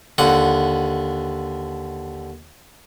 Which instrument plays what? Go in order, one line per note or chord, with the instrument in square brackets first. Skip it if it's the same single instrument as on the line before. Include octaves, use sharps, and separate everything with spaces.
[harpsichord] D#2 D3 F#5